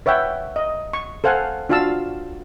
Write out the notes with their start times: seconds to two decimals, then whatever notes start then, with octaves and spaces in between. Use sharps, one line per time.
0.06 B4 C#5 E5 F#5 G5
0.56 D#5
0.93 C#6
1.24 A4 C5 F5 F#5 G#5
1.69 D4 F4 F#4 F5 A5 E6